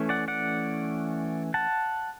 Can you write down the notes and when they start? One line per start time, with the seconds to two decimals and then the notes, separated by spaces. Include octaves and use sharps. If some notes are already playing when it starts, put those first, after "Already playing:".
Already playing: E3 A3 C#4
0.09 D5 F#5
0.28 D5 F#5
1.54 F#5 A5